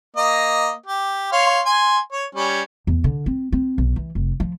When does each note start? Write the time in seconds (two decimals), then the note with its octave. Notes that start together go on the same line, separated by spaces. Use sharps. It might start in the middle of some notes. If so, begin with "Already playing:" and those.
0.17 A#3 D#5
0.86 G4
1.32 C#5 F5 C6
1.65 G#5 C6
2.12 C#5
2.35 G3 C#4
2.87 E2
3.04 D3
3.26 C4
3.52 C4
3.78 B1
3.96 E3
4.15 F1
4.40 F3